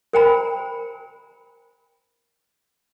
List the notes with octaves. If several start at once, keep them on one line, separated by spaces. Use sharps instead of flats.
A#4 C5 G5 G#5 A#5 B5